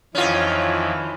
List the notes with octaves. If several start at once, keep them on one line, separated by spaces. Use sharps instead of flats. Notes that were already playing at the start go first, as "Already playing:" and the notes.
F2 D#3 E3 C#4 F4